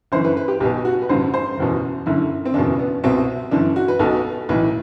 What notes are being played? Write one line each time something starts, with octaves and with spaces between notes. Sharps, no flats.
G1 F#2 E3 C5
B4
B4
G4
B1 B2 G4
F#4
B4
A1 G2 D3 C5
C5
F#1 E2 B2
G1 F#2 D3 E4
C4
F#1 E2 B2 D4
B3
C2 B2 C4
G1 F#2 E3 D4
F#4
B4
B1 B2 A4
B1 A2 E3 B4